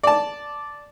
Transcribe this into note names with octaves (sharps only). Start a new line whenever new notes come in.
D5 A5